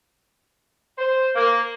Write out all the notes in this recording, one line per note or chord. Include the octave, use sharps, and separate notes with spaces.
C5
A#3